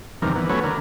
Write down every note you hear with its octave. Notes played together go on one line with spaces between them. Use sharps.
E2 G2 C3 D#3 A#4
E3 B3
F#3 A3 B3 C#4 B4 C#5
D3 A#4